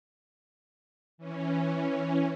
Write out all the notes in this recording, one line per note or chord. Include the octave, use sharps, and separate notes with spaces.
E3 C#4